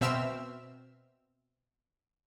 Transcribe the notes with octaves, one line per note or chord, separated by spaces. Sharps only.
B2 C4 E5 E6 F6 E7